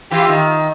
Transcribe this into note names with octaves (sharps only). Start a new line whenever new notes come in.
E3 F4 G4
D#3